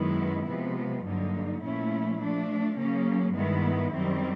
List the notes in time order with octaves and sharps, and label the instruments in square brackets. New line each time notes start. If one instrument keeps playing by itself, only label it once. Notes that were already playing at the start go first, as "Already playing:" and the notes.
Already playing: [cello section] F#2 D#3 G#3 B3 E4
C3 F3 G#3 B3
G2 D3 F#3 A#3 D#4
A#2 F3 A3 C#4 E4
F3 A3 D4
C#3 F#3 A#3 C#4
G2 D#3 G#3 B3 E4
F#2 D#3 G3 C4